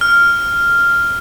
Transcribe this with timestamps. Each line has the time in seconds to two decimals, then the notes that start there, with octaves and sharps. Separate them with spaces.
0.01 F6